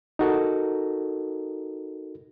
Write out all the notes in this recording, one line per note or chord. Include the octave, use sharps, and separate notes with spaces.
D#4 F#4 A4 A#4